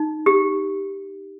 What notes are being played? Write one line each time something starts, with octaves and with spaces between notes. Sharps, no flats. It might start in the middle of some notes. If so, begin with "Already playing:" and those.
Already playing: D#4
G4